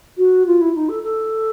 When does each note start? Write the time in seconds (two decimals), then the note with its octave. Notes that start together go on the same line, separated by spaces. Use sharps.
0.17 F#4
0.46 F4
0.60 E4
0.75 D#4
0.88 A4
1.02 A4